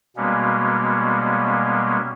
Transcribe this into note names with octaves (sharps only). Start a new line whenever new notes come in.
B2 G3 G#3 A#3 B3 C#4